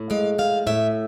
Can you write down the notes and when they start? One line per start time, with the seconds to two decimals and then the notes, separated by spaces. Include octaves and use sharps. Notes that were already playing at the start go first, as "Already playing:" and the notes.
Already playing: A2
0.10 G#3 F5
0.38 A2 F5
0.67 A2 E5